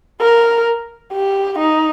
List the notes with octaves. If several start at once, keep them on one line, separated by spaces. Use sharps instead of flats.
A#4
G4
D#4